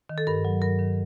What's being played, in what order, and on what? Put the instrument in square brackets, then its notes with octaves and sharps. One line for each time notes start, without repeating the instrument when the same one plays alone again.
[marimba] D#3
A4
G2 A#4
F#3
G2 A#4
D#3